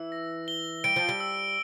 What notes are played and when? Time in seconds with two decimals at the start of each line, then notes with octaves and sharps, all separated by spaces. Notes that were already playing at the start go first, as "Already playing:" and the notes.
Already playing: E3 E6
0.12 A#6
0.48 G7
0.84 G3 D7
0.96 F3
1.09 G3
1.20 E6